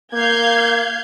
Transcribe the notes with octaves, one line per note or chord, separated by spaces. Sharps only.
A#3 F5 G6 G#6